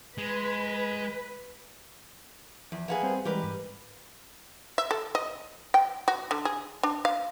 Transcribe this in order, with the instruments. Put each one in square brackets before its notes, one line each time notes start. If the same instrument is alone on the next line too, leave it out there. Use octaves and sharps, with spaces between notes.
[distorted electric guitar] G#3 [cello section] B4
[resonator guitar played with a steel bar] E2 [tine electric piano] F3
[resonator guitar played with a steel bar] A#3 B3 G#4
[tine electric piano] G3 C4 C5
[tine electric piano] E3 G3 G#3 [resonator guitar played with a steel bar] G4 A#4 B4
[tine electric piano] G#2
[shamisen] E5
A4
D#5
G5
F#4
D3
G#4
D4
F5